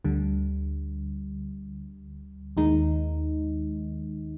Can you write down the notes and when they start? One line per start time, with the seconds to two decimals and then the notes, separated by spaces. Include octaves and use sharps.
0.05 D2 D3 G3
2.57 D#2 D#3 G#3 D#4